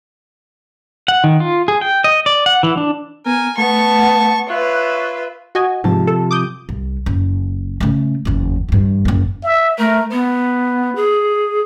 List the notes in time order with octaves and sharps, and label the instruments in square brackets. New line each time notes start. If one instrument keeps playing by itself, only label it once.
[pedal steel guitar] F#5
D#3
F4
G#4
G5
D#5
D5
F#5
E3
D4
[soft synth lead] B3 [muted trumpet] A#4 [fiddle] G#5
[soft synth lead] A3 [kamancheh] B3 [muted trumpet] A5 [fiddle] C#6
[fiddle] F4 B4 [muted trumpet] C#5 [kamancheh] E5 [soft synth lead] F#6
[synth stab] F#4 D#5 G#5
[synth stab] G#2 [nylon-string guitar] C3 F3 A5
[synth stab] A4
D6 D#6 G6
[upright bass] C2
F#1
C#3 A3
F#1 E2
G2 E3
F#1 A#3
[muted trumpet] E5
[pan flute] A3 [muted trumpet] A#4
[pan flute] B3 [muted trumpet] B4
[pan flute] G#4